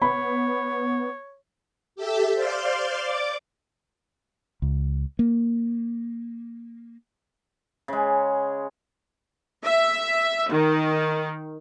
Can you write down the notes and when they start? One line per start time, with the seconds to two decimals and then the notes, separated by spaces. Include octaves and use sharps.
0.02 B3 C#5 B5
1.96 G4 A4 E5
2.34 C5 D5 F5 C6
3.01 D5 D6
4.62 C#2
5.19 A#3
7.88 C#3 G#3
9.64 E5
10.50 D#3